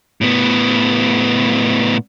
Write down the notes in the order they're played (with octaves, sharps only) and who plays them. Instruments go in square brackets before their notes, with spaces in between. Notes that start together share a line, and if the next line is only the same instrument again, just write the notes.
[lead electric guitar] A2 B3